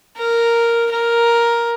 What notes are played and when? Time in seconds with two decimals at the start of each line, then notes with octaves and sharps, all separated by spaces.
0.17 A#4
0.91 A#4